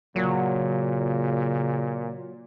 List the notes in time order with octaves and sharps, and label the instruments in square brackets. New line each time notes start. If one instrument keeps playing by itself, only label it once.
[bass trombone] A#2 [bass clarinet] C#3 [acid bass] F#3